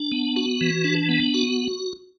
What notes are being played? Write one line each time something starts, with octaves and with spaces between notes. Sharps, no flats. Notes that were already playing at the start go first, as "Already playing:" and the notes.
Already playing: D4
B3
F#4
E3
D4
B3
F#4